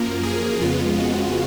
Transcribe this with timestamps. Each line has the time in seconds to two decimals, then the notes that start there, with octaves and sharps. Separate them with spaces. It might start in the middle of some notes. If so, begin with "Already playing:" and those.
Already playing: F#2 F3 A#3 A#4
0.23 G#4
0.61 F2 C#3 G#3 B3 F4
0.98 F#4